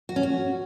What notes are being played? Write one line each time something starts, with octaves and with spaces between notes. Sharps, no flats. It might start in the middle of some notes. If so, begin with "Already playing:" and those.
F#4
C#4
F#4